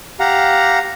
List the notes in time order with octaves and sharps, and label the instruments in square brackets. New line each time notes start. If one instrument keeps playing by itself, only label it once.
[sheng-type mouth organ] G4 F5 F#5 A#5